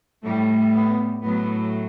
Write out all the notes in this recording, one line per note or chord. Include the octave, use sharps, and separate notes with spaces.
A2 G3 A3
B3
A2 F#3 A3 B3